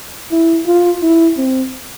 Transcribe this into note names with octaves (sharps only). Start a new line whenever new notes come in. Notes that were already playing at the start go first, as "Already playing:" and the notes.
E4
F4
E4
C4